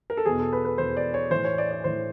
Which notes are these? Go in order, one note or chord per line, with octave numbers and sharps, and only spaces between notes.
A#4
A4
E2 B2 G#4
A4
B4
B4
E2 B2 C5
D5
C#5
A2 E3 C5
C#5
D5
D5
A2 E3 C5